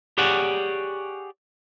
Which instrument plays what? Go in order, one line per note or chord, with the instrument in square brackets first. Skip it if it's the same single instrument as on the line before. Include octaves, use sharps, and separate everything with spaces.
[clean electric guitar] G4 G#4 C#5 D5 F#5